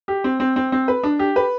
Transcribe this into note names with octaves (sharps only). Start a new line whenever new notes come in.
G4
C4
C4
C4
C4
B4
D4
G4
B4